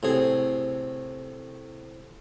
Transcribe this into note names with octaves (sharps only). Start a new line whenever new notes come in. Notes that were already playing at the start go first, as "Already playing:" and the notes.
A2 C3 G#4